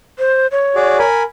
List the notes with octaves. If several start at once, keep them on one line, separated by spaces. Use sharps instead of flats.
C5
C#5
F#4 G#4 D5
A#4 G#5 B5